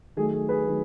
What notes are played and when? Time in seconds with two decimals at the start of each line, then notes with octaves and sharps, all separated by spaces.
0.16 D#3 F#3 A3 G#4
0.33 G#4
0.49 G#4 B4
0.66 D#3 F#3 A3